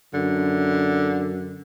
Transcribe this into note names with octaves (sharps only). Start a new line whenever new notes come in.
F#2 D3